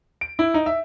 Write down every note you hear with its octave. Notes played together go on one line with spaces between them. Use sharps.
D7
E4
D#4
E5